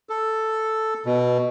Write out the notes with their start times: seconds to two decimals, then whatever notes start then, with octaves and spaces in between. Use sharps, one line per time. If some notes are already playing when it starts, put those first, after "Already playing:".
0.09 A4
1.06 B2